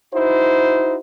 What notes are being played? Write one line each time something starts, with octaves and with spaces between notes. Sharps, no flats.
D#4 E4 F#4 C5